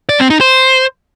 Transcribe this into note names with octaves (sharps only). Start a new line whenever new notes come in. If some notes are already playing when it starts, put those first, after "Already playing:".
D5
C4
D#4
C5